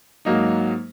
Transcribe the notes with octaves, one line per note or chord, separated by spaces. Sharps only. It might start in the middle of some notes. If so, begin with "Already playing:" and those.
G#2 F#3 A#3 D#4